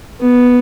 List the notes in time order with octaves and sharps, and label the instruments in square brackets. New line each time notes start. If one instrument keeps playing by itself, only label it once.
[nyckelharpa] B3